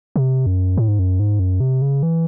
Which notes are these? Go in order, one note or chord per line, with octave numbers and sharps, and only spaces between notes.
C3
F#2
A2
G#2
F#2
G#2
F#2
C3
C#3
E3